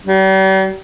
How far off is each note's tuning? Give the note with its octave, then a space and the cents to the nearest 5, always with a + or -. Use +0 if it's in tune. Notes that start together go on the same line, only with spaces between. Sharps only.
G3 -40